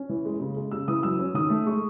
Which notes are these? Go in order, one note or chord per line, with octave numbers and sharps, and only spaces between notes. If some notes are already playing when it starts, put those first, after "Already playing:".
Already playing: C#4
E3
G#3
C#3
G#3
C#3 E6
E3 D#6
F#3 E6
C#4
D#3 D#6
A3
G#3 C#6